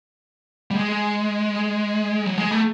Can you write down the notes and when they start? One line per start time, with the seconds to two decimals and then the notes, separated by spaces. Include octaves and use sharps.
0.71 G3
0.76 G#3
2.26 F#3
2.38 G#3
2.51 A3